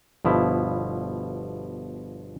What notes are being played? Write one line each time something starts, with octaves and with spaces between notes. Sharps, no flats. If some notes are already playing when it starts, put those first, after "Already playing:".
G1 B2 F3 E4